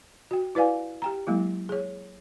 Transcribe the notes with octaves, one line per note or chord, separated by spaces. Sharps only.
F#4 G5
E4 B4 D5 F5 G#5
G4 G5 A#5
F#3 G#3 A#3 E4
G#4 C#5